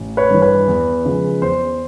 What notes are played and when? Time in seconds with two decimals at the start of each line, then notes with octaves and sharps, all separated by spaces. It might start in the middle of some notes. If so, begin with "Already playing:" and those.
Already playing: A1
0.17 B4 C#5
0.31 G2 E3
0.42 B4
0.68 E2
1.05 C#3 F3 G#3
1.42 E2 C5